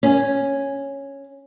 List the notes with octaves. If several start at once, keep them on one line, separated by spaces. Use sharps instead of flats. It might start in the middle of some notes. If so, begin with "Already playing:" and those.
C#4